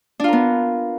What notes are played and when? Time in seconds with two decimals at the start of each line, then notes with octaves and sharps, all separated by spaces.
0.20 D4
0.24 F4
0.28 A#4
0.33 B3